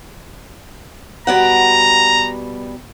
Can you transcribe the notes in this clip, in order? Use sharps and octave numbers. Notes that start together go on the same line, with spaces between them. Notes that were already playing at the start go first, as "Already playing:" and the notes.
B2 G3 F#5 A#5